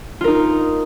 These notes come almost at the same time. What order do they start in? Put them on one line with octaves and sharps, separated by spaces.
F4 A#4 D#4